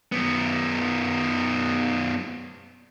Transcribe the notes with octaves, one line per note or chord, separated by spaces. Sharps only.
F#2 B3